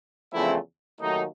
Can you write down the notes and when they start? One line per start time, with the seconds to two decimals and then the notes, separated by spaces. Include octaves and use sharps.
0.32 E2 C#3 F3 A3 C4 E4
1.01 D#2 D#3 F#3 A3 D#4